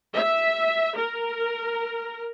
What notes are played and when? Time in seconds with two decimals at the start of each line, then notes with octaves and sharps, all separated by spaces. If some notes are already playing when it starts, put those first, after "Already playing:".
0.14 E5
0.98 A#4